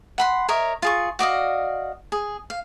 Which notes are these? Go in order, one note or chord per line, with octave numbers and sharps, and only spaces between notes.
F#5 B5 C6
A#4 C#5 D#5 E5
F4 G#4 C#6
F#4 D5 D#5 F5
G#4
F5